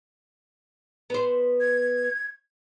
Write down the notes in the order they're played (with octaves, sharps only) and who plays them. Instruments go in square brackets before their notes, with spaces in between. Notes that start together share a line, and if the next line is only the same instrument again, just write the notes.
[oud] B3 C5
[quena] G#6